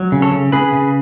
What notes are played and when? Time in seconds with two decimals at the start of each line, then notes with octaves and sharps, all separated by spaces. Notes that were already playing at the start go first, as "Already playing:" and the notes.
Already playing: F#3
0.12 C#3
0.22 A4 C#5
0.32 C#3
0.52 C#3 G#4 B4
0.73 C#3